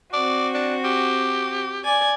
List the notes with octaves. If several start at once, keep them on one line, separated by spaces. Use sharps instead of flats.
C4 F#4 D5
D4
G4
D5 G#5 G#6